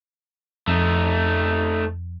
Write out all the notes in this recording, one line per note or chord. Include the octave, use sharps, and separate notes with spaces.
F2 A3 D#4